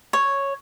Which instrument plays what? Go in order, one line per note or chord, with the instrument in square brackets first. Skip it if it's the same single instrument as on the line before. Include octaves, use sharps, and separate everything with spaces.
[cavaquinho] C#5